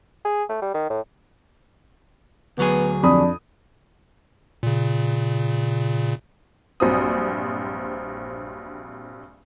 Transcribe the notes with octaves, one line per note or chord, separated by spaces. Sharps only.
G#4
A3
G3
D#3
A2
D2 F#3 B3 G#4
F2 D4 B5 D#6
A#2 C#3
A#1 G2 F#3 C4 D#6